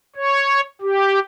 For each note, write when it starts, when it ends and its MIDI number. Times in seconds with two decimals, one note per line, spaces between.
0.16 0.61 73
0.81 1.19 67